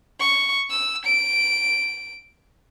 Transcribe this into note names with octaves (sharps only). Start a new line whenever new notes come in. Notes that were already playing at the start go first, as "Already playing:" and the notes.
C#6
E6
D7